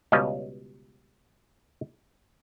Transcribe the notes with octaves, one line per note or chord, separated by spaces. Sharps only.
C#2 B2 G3 C#4 D#5 F5